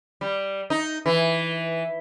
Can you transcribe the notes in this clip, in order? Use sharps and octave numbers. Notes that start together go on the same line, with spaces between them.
G3
D#4
E3